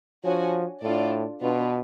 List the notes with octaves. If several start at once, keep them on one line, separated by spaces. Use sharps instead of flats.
F3 D4 F#4 C#5 G#5
A2 D4 F4 A4 D5
B2 B3 D4 F4 B4